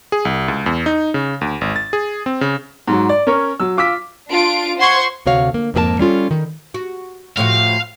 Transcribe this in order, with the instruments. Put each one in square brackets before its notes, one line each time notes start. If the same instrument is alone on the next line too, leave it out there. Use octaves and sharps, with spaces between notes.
[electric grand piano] G#4
C2
C#2
E2
D#4
C#3
D2
G#1
A6
G#4
C4
C#3
[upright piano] G#2 F#3
D5
C#4 A#4 C#5
F#3 E6
F4 D6 E6 B6
[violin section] D4 F4 D7
C5 F#5 C6 C#6 G#6
[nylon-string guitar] D2 C3 F#4 C#5 F5
A#3
F2 G#2 A#3 G#4 A#4 A5
G3 C#4 F4 A4
D#3
[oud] F#4
[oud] A2 F3 F#4 [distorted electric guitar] F5